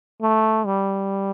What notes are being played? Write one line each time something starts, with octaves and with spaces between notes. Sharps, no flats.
A3
G3